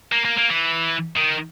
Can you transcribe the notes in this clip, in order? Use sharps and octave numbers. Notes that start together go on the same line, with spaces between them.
A#3
A#3
A#3
E3
D#3